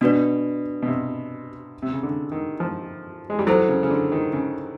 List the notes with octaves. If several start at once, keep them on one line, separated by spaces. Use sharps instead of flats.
B2 D4 F#4 B4 D5
B2
C3
C3
C#3
D3
D#3
F3
G#3
G3
F#3 E4 A4 C5
C#3
C#3
D3
D#3
C#3